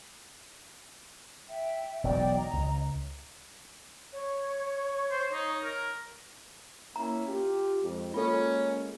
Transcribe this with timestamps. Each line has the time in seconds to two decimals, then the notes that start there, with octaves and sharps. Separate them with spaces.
1.49 E5 G5
2.04 E1 B1 F#3 D5 D#5 G5
2.36 D#5 A#5
2.53 C#2
4.12 C#5
5.11 C5
5.32 D#4
5.63 A#4
6.96 A#3 C#4 E4 A#5
7.27 F4 G4
7.83 F2 G#3
8.14 A#3 C#4 F4 A4